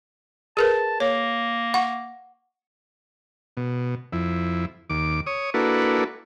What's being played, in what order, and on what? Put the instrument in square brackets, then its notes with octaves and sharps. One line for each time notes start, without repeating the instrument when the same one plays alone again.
[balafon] G#4 A#4 B4 [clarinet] A5
[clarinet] A#3 [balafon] C#5
[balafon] F#5 C#6
[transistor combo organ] B2
F2 E4
D#2 D6
C#5 D#6
A#3 D4 E4 F#4 A4 B4